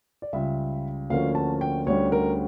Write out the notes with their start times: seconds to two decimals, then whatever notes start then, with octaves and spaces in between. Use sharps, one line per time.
0.22 D5
0.33 C#2 C#3 G3 E5
1.10 D2 D3 F3 A#3 C#4 F5
1.35 A5
1.61 G5
1.86 D2 D3 G3 C#4 C#5
2.12 A#4